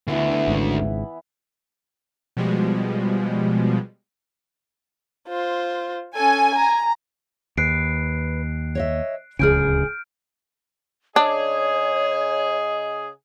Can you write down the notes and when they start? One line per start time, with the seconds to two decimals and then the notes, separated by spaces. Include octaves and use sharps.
0.08 D2 E3 B3 E4
0.48 G#1 G#2 C#3
2.37 B2 F3 G3 G#3
5.28 F4 C5
6.16 C#4 A4 G#5
6.55 A#5
7.57 D#2 B4 F#6 C7 D7
8.75 C#5 D#5 E5
9.39 D1 C#2 C#3 G#4 G#5 F6 G6 D7
11.16 C#3 D4 G#4 C#5 D#5